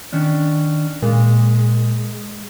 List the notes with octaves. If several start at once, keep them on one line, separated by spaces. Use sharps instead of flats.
D#3 C#4 D4
A#2 G#3